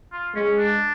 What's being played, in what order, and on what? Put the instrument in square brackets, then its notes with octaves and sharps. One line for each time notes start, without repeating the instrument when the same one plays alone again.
[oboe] F4
[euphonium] G#3 [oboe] C#4
[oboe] D4